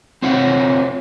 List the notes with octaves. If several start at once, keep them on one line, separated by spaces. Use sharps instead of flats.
C4 F4 C5 C#5 F#5